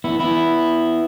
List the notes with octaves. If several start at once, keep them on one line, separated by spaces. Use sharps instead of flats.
B3 E4
B3 E4